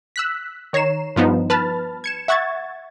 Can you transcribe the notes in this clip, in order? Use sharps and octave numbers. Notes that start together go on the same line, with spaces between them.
E6 F#6 B6
D#3 C#5 A#5 C7 E7
G2 F3 B3 D#4
B4 A5 B5 F6 A6
G#6 C#7 E7
E5 F#5 C#6 G#6 A6